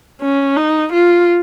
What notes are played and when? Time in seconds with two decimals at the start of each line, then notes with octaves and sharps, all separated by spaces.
0.21 C#4
0.56 D#4
0.93 F4